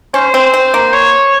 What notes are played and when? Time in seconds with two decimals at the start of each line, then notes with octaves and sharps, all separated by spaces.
0.14 C#4 C5
0.34 C4
0.54 C4
0.74 A#3
0.93 C#5